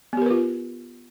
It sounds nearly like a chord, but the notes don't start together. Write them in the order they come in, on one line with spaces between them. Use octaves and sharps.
B3 G4 A#4 B4 F4